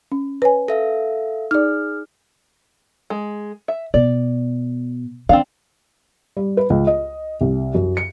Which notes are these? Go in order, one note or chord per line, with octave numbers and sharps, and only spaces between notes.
C#4
B4 C#5 G#5
A4 E5 F5
D#4 G#4 D5 F6
G#3
E5
B2 D5
D#3 C4 D4 F5
G3
B4
C#2
D#5
C2
F#2
C#7